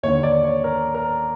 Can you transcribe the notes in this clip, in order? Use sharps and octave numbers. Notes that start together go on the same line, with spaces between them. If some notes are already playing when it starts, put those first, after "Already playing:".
D#2 D3 C#5
D5
C#5
A#4
A#4